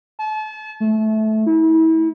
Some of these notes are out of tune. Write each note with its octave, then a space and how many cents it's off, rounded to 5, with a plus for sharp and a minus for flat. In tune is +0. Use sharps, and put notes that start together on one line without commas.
A5 -35
A3 -15
E4 -35